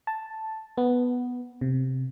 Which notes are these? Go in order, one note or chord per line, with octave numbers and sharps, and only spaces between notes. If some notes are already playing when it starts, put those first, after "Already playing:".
A5
B3
C3